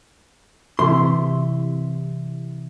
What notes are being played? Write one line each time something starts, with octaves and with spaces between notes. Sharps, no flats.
C3 E3 E5 C6